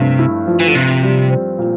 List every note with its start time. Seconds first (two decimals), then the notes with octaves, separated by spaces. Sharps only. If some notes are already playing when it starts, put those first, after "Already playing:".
Already playing: G2 C3 F3 A3
0.19 E4
0.47 F3
0.60 E3
0.68 D3
0.75 C3 F4
1.03 G3
1.30 C4
1.59 A#2